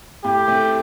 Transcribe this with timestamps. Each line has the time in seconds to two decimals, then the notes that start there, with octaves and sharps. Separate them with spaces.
0.24 A2 G4
0.48 A3 C4